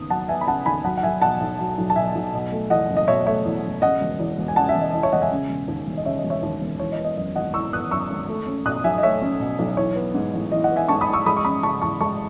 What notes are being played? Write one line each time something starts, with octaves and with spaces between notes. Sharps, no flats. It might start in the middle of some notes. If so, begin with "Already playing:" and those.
Already playing: D#2 C#3 B3 D#6
F#3 F#5 A5
B3 E5 G#5
B5
C#3 F#5 A5
D#2 G#5 B5
F#3 F#5 A5
F#5
B1 E5 G#5
B2 F#5 A5
B1
F#3
B1
A5
B2 E5 G#5
B1
B2
A3
E2 D#5 F#5
F#1
D#5
B2 C#5 E5
A3 C#5 E5
E2
F#1
C#3 D#5 F#5
E1
E2
E1
G#5
C#3 F#5 A5
E5 G#5
E1
D#5
E2 D#5
C#5 E5
E1 D#5 F#5
E5 G#5
C#3
E1
D#2
E1
D#5
C#3 C#5 E5
D#5
E1
C#5 E5
D#2
E1
E3 C#5
D#5
B3
D#5
F#2 D#5
G#1 D#5 F#5
E3 C#6 E6
B3 D#6 F#6
F#2 C#6 E6
G#1
A3
C#4
B2 D#6 F#6
B1 E5 G#5
D#5
A3 C#5 E5
C#4
B2
B1
E3 C#5
B3
G#2
A1
E3 D#5
D#5 F#5
B3
E5 G#5
G#2 A5 C#6
B5 D#6
A1
C#6 E6
G#3 B5 D#6
C#6
C#4 B5 D#6
C#3 A5 C#6
E2 A5 C#6
G#3 A5 C#6